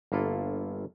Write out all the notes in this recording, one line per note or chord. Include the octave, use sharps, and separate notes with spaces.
G1 A#3 E4 F4 A4